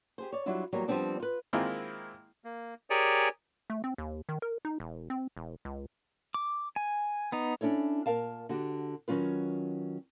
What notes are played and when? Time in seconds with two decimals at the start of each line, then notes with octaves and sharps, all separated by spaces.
0.18 G4 G#4 C5
0.33 C#5 D5
0.46 F#3 G3 D4 E4 F4
0.73 E2 F#3 G3 A#3
0.88 F3 G3 B3 C4 D4
1.20 F4 B4
1.53 D#3 G#3 A#3 C4 E4 F4
2.44 A#3
2.90 G4 G#4 A#4 C#5 D5 G#5
3.70 A3
3.84 C4
3.98 D#2
4.29 D#3
4.42 A#4
4.65 D#4
4.80 E1
5.10 C4
5.37 E1
5.65 C#2
6.34 D6
6.76 G#5
7.32 B3 D#4
7.61 C#4 D4 E4 A4 C#5
8.06 A#2 A#4 F5 A5
8.49 D3 F#4 G4
9.08 D#3 F#3 C#4 F4 B4